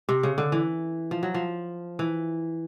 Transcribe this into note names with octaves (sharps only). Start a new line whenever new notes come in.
C3
C#3
D3
E3
F3
F#3
F3
E3